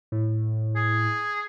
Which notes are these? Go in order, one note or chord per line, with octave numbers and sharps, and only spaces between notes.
A2
G#4